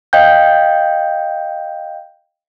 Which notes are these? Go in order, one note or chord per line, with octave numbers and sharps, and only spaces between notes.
D#5 F5 G5 G6